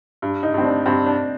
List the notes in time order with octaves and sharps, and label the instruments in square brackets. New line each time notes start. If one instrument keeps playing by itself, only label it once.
[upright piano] G2
[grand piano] D#4
[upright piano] G2 [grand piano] C4
[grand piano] D4
[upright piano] G2 [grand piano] C4
[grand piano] D4